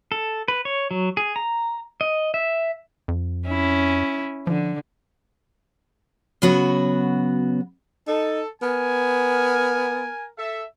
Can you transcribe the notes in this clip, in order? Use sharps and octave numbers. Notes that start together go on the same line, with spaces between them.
A4
B4
C#5
F#3
G#4
A#5
D#5
E5
F2
C#4 E4
D3 F3
C#3 F#3 B3 F#4 C#5
D#4 A4
B3 A#4 G#5
A4 E5